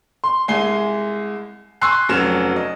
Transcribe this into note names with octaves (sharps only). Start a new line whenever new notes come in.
C6
C2 G#3 G#5 C7 G7
G#5 C6 C#6 E6 F#6 C7
F1 F#3 C#4 F6 E7
D#5